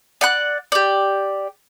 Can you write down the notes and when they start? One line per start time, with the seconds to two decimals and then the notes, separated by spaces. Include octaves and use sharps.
0.21 D5 F#5 F#6
0.72 G4 D5